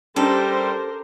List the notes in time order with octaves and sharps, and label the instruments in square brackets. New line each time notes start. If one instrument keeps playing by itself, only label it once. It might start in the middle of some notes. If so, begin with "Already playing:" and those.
[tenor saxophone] G3 [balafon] C#4 D4 [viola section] G4 A#4 C5 [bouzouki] A4